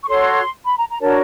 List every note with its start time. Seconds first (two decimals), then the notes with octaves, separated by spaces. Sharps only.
0.03 C#6
0.08 F#4 A4 C#5 C6
0.66 B5
0.78 A#5
0.90 A#5
1.01 D4 F#4 A#4 C#5 A5